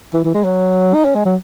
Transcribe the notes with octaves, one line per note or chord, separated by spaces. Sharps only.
E3
E3
G#3
F#3
D#4
C#4
G#3
F#3